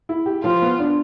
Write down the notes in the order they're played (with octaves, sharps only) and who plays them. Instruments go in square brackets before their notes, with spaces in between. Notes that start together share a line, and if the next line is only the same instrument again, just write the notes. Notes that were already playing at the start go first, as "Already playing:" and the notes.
[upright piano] E4
G4
[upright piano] F3 [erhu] F4
[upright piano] B3
D4